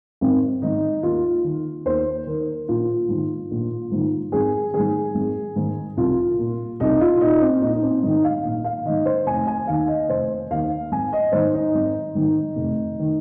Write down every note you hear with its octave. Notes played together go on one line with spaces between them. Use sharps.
G#1 C4
G#2 D#3 D#4
D#2 F4
D#3
D#2 C5
D#3 A#4
A#1 F4
G#2
D#3
A#1
G#2 D#3
G#1 G#4
G#2 D#3 G#4
G#1
G#2 D#3
C2 F4
A#2
C2 D#4
F4
A#2 D#4
C4
A#1 D#4
D#4
C4
G#2 D#3 D#4
F5
A#1
F5
G#2 D#3 D#5
C5
F1 G#5
G#5
D#2 D#3 F5
D#5
F1 C5
D#2 D#3 F5
G#1 G#5
D#5
G#2 D#3 C5
D#4
G#1
G#2 D#3
F1
D#3